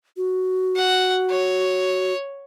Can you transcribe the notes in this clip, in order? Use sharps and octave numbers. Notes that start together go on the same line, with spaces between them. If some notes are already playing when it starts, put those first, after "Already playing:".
F#4
F#5
C#5